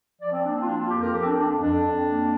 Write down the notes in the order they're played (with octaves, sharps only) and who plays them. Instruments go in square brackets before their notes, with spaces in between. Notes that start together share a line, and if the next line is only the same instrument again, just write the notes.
[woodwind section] F3 D5
C4
A#3 D4
C4
F4
A#3 D4
F4
F2 G4
A#4
F3 G4
C4
D4
F2 D4
F2 D4
F2
A#3